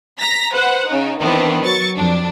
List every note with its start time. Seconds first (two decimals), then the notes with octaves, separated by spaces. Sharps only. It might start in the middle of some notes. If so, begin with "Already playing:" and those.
0.19 A#5 A#6 B6
0.53 B4 C5 F#5
0.88 C#3 D#4
1.19 D#3 E3 B3 C4 D4
1.64 F#3 C#6 A6
1.96 F2 D4